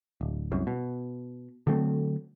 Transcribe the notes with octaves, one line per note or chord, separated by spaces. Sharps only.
D1
C2 F#2
B2
D3 F#3 A3 C4